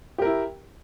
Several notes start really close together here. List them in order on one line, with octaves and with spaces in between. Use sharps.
G4 A#4 E4